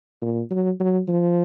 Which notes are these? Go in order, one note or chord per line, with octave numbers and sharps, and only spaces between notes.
A#2
F#3
F#3
F3